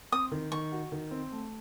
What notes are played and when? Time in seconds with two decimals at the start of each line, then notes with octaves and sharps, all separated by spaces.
0.12 C4 D#6
0.32 D#3
0.52 D#3 C#6
0.72 F#4
0.92 D#3
1.11 C4
1.32 A3